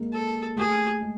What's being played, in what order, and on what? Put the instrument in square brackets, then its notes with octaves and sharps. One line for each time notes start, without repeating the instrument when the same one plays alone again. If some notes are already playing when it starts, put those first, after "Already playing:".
Already playing: [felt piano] G#3 A#3
[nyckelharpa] A4
[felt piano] A3 [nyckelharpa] G#4
[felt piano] G#3